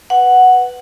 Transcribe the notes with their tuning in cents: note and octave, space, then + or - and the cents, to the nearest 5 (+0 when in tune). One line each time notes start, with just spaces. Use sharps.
B4 +0 F#5 +0